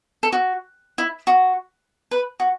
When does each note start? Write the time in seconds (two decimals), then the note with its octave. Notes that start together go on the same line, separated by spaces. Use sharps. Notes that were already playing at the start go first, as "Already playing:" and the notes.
0.23 A4
0.32 F#4
0.98 E4
1.27 F#4
2.11 B4
2.40 F#4